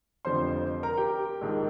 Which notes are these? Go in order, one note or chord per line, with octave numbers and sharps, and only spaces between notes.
F1 F2 D3 F3 C5 C6
A#4 A#5
G4 G5
A#1 G#2 D#3